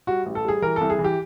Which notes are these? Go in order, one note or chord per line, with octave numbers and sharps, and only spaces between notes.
G3 F#4
A1
A4
G3 G#4
E3 A#4
C2 A4
G#4
E3
G4